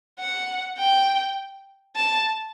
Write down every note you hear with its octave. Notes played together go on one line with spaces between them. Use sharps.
F#5
G5
A5